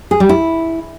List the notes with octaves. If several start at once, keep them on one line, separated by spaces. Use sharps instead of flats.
G#4
G3
E4